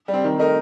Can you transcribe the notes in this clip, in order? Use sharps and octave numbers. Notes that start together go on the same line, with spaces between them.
G3
C4
D#3
A3 D#4 A#4